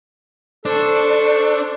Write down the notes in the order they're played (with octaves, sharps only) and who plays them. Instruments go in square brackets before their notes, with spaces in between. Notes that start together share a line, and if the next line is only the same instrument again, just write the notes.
[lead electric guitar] D4 [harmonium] A4 [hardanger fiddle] C5 C#6